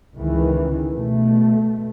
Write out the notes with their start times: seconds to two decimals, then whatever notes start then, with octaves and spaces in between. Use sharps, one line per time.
0.16 C#2 D#3 E3
0.92 B2 A3